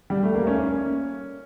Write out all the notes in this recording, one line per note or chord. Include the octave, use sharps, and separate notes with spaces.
G3
A3
A#3
C#4
C#4